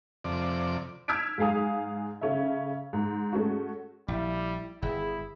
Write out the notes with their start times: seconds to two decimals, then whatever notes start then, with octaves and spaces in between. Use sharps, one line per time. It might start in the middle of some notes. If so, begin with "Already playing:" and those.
0.24 F2 C3 D5
1.08 E6 F6 G#6 B6 D7
1.38 G#2 G#3 F5 G#5 D#6
2.21 C#3 C#4 A4 E5
2.93 G#2
3.32 G#3 A3 C#4 F#4
4.08 A#1 G3 E4
4.82 G1 E4 G#4